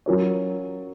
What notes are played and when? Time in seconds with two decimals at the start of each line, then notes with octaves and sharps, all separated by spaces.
0.06 F#3 C#4 F4 A#4 C#5